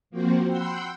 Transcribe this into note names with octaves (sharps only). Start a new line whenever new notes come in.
F3 A#3 C4 F#4 C5
F#5 G5 B5 C6 E6 G6